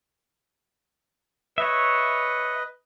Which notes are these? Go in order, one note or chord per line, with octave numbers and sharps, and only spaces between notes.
B4 C#5 D#5 E5